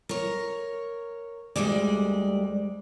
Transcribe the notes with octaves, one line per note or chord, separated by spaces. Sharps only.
A#4 C#5
D2 C3 G3 G#3 D5